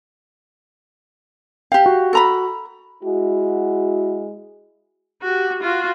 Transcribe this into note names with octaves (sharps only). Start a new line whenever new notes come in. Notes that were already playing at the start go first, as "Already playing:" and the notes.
G4 F5 G5
F#4
A4 A#5 B5
G#3 E4 F#4
F#4 G4
F4 F#4